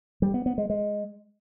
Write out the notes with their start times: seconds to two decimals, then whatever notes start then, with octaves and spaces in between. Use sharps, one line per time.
0.22 G3
0.34 B3
0.46 B3
0.58 G#3
0.70 G#3